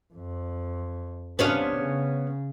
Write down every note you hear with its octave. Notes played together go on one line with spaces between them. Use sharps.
F2
C3 B3 C#4 D4 F5
C#3